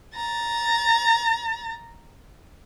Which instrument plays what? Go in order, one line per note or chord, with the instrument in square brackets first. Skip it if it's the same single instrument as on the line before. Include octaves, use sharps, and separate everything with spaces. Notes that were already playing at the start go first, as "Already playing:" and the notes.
[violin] A#5 A6